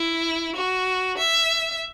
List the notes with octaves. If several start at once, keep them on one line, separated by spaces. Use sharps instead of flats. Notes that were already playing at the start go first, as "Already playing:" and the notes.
Already playing: E4
F#4
E5